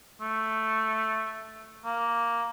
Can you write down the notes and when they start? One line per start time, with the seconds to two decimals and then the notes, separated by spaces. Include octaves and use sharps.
0.21 A3
1.85 A#3